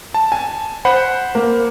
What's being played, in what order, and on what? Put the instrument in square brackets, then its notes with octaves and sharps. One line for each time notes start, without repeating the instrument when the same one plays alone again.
[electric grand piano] A5
[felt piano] G#5
[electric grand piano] C5 F#5 B5
[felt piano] A#3